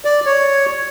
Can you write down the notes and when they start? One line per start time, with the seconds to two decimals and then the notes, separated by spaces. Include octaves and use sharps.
0.05 D5
0.26 C#5